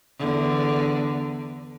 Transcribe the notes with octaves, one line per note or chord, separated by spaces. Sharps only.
E2 D3